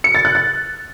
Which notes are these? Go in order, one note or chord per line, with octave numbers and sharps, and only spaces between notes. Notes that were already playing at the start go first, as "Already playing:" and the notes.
C#7
A6
F#6
A6